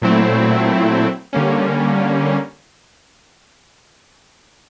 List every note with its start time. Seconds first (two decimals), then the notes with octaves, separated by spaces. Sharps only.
0.02 A#2 F#3 A3 C4 E4
1.33 D3 G3 A#3 C#4